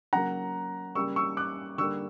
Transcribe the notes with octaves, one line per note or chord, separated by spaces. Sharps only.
C#3 F#3 A#3 F#5 A#5
C#3 G3 A#3 C#6 E6
C#6 E6
D6 F#6
D3 G3 A#3 C#6 E6